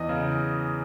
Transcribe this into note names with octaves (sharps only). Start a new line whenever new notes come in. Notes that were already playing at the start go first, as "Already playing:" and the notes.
Already playing: E2 D#5
C#3